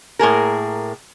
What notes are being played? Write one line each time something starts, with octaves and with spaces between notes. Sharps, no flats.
A2 A#3 G#4 A#4